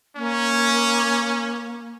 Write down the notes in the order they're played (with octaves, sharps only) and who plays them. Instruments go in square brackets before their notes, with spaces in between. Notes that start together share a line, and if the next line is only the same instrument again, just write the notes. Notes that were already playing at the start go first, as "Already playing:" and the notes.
[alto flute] A#3 [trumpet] C#4